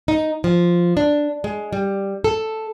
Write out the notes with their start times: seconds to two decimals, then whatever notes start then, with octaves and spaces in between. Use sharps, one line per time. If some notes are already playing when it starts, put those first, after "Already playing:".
0.08 D#4
0.44 F3
0.97 D4
1.44 G#3
1.73 G3
2.24 A4